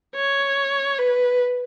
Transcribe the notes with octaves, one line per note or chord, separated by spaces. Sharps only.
C#5
B4